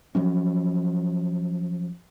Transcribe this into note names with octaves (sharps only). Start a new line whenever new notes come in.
F3 F#3 C#4